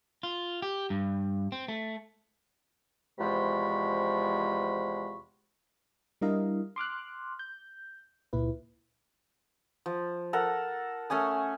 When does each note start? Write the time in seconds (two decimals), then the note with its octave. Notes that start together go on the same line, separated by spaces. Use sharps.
0.23 F4
0.62 G4
0.90 G2
1.52 C4
1.68 A3
3.19 E2 C3 F3 G#3 B5 C#6
6.21 G3 D4 E4 A#4 D#5 F5
6.76 C6 D6 F6 F#6
7.39 G6
8.33 C#2 A#2 E4 B4
9.86 F3
10.33 A4 A#4 F#5
11.10 A3 C#4 G#5 D#6